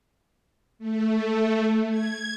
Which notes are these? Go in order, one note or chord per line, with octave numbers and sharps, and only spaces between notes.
A3
G#6